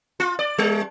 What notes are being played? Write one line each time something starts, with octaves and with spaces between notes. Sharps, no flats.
F4
D5
G3